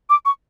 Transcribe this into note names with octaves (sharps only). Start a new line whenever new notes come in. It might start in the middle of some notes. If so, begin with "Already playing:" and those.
D6
C#6